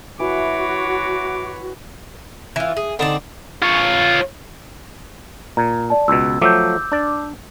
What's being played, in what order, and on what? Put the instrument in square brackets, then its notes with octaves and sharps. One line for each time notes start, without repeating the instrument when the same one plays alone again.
[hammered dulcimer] E3 [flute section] F#4 [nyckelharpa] C#5 B5 [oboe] D6
[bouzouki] E3 F4
G#4
[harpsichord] D3 D#4 A5 [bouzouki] C4 D5
[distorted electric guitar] F4 C#5
[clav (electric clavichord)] A#2 [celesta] A#5
[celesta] D5 A5
[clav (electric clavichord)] C#2 B2 [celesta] E6
[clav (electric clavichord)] F3 F#3 A3 [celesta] D6 E6 G6
[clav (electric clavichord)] D4 D5